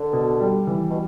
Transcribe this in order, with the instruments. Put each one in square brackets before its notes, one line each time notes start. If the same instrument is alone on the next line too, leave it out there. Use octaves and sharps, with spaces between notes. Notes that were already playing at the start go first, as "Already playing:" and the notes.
Already playing: [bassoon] D3
[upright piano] B2
G3
E3
[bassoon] B2